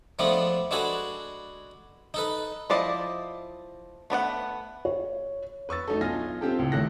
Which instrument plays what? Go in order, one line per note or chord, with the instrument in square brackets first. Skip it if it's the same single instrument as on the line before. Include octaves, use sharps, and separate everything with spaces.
[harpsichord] F3 G#3 A3 B3 D4
G#3 D4 F#4 A4 B4 G#5
D#4 A4 B4
[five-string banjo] F3 E4 D5 D#5
A3 B3 D5 F#5
[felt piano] C#5
[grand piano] B4 C#6 E6 A6
A3 D#4 F#4 A4
B1 F4 D#5 G#5 F6 A#6
C4 F4 G4 A4
C#2 A2
D#1 G#1 A3 A4 F#6 A#6